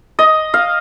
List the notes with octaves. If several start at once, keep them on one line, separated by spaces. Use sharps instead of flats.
D#5
F5